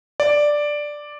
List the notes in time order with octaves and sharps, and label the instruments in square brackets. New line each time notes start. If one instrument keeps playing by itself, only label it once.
[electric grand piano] D5